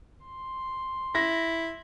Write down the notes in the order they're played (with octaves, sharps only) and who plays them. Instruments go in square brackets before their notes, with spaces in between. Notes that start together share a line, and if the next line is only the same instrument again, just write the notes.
[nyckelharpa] C6
[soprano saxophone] E4 [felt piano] A#6